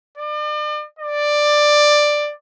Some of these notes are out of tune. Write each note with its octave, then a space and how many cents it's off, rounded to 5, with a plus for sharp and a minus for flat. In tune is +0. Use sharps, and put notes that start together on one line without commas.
D5 +40
D5 +10